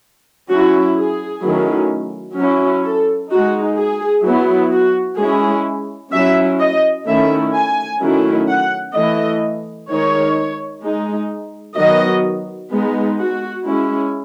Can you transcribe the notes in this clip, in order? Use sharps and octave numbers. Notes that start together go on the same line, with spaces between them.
F#3 C#4 E4 F#4
G#4
D#3 F#3 A3 C#4 E4
F#3 C#4 E4
A4
G#3 D#4 F#4
G#4
F#3 B3 E4
F#4
G#3 C#4 E4 G#4
F#3 C#4 E4 E5
D#5
D#3 A3 C#4 E4 E5
G#5
D#3 F#3 A3 C#4 E4
F#5
E3 A3 E4 D#5
D#3 G#3 D#4 C#5
G#3 D#4
D#3 F#3 B3 D#5
G#3 B3 D#4
F#4
G#3 C#4 E4